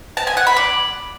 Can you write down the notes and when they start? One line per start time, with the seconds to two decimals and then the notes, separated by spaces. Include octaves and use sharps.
0.17 A5
0.27 G#5
0.37 F#5
0.47 B5
0.57 D5